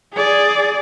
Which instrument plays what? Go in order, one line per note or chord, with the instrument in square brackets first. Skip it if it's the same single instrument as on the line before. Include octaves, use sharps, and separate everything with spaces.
[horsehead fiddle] G#4 D5